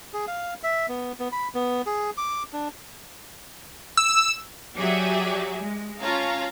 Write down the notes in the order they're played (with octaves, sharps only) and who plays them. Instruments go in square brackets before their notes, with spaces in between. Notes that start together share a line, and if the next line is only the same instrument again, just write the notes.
[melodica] G#4
F5
E5
B3
B3
B5
B3
G#4
D6
D4
[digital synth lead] E6
[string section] F#3 G4 G#4 D5 E5
G#3
C#4 F4 C#5 F5 A5 A#5